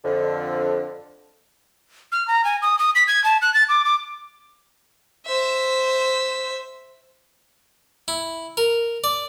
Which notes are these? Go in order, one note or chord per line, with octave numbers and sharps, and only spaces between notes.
F2 D3
F6
A#5
G#5
D#6
D#6
B6
G#6
A5
F#6
A6
D6
D6
C5 E5
E4
A#4
D5